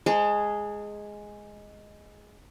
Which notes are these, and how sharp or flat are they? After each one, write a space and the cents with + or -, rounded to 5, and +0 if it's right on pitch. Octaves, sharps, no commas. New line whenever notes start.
G#3 +0 G#4 +0 A5 +35